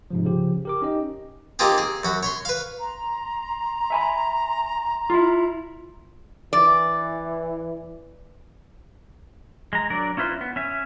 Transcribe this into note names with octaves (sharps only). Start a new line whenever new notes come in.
G#2 C3 F3
C#3 F3 G4
G4 A#4 D6
C#4 D#4 G4 D#5
A#3 C4 D#4 F4 G4 G#4
G#4
F#2 F#4 B5
C#5 B5 C6
B4 F5
A#5 C6
E5 G#5 B5
E4 F4
E3 D5
G#3 A#5
F#3 D4 A#4 D5
C#4 E4 F4 B4 C5
B3
C#4 E5